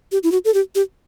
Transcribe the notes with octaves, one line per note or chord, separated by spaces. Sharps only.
G4
E4
F#4
A4
G4
G4